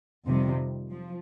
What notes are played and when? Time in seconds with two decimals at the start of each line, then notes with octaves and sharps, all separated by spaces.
0.26 F2 C3 D#3 G3
0.91 F3